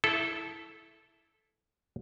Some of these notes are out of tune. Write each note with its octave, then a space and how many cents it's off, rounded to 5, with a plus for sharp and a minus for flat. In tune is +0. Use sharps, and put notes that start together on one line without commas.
E4 +0 A4 -15